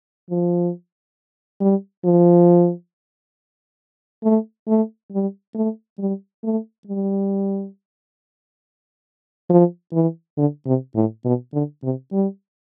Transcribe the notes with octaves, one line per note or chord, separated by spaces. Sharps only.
F3
G3
F3
A3
A3
G3
A3
G3
A3
G3
F3
E3
D3
C3
A2
B2
D3
C3
G3